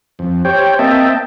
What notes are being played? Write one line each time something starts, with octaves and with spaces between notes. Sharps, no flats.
F2
G4 C5 C#5 G5
A#3 C4 D#5 E5 G5 A5